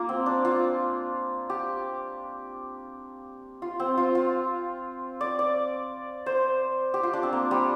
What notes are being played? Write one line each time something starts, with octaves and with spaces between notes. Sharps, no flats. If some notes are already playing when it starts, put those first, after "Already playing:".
Already playing: A#3 F4 G4
C4
D4
F4
G4
F4
C4
F4
F4
D5
D5
C5
G4
F4
D4
C4
A#3
G3